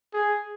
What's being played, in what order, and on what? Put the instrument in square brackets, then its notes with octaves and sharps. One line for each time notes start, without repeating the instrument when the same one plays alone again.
[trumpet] G#4